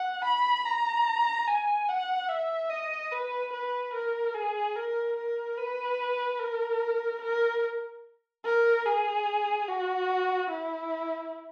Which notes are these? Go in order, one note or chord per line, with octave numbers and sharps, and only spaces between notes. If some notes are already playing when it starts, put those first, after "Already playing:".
Already playing: F#5
B5
A#5
G#5
F#5
E5
D#5
B4
B4
A#4
G#4
A#4
A#4
B4
A#4
A#4
A#4
G#4
F#4
E4